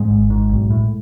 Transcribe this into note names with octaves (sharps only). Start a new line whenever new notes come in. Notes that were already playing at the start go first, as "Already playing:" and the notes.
Already playing: G#2 G#3
G#1
G#2
B1
A2